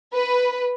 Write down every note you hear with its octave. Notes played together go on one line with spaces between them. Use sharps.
B4